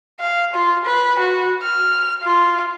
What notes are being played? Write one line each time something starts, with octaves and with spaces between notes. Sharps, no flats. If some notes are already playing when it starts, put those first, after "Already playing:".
F5
F4
B4
F#4
F6
F4